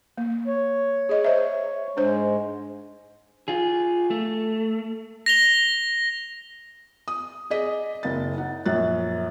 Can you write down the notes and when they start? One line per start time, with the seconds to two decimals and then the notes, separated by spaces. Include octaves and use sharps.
0.18 A#3
0.47 C#5
1.09 G#4 D#5
1.25 C5 E5
1.97 G#2 G#3 D4 C5
3.48 F4 G#4
4.10 A3
5.26 A#6 F7 G7
7.08 D#6
7.50 G#4 D5 D#5 B6
8.03 F#1 A6
8.38 D#4 F#5
8.66 A#1 F#2 F#6 A6